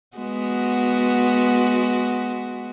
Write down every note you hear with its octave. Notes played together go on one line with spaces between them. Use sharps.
G#3 B3 F#4